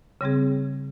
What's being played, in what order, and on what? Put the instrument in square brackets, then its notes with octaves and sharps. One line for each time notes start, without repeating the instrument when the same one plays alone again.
[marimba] C#3 G3 C4 G#4